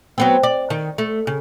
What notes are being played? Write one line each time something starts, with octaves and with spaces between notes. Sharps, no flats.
F#3 B3 C4
D5
D#3
A3
C#3